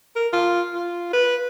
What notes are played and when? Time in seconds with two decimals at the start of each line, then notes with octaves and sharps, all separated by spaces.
0.16 A#4
0.33 F4
0.74 F4
1.13 B4